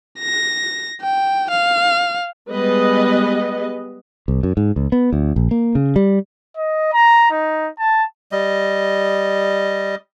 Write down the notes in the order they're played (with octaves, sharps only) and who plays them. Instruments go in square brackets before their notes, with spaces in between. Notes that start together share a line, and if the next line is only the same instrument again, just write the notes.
[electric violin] A#6
G5
F5
[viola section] G3 G#3 B3 B4 D#5
[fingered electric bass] C2
F#2
G#2
C#2
B3
D2
A#1
A#3
C#3
G3
[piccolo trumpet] D#5
A#5
D#4
A5
[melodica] G3 D#5